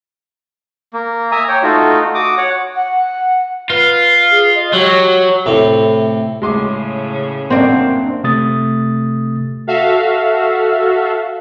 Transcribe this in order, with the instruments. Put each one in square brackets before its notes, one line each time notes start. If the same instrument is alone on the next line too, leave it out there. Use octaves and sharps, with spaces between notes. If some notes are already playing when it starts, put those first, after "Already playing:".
[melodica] A#3
E5 G#5 A#5 D#6
C#5 G5
A3 D#4 F4 F#4
F#4 D6 D#6
C#5 F#5
[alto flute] F#5
[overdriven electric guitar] F4 [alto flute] B4
[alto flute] G#4
D#5
[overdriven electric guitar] F#3 [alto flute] G4
[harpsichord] A2 C3
[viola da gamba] A2 C#3 [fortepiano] G#3 C6 D6
[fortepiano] A1 F#2 C5 [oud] A#3 D4 [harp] C4
[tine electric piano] C3 A3 D#6 A6
[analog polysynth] F#4 A4 E5 F5